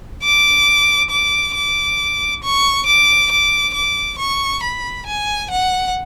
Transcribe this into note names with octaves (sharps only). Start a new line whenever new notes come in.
D6
D6
D6
C#6
D6
D6
D6
C#6
B5
G#5
F#5